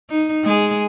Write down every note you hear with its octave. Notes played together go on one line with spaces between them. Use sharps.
D#4
G#3 G#4